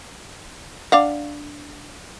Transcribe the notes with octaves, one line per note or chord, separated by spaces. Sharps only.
D4 F5 F#5